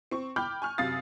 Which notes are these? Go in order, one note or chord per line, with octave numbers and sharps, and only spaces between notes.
C4 C#6
G5 B5 D6 F6 G6
G#5 C#6 F6
F#2 C3 F5 D#6 A6